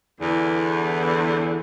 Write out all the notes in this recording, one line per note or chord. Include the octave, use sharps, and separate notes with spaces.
E2 D3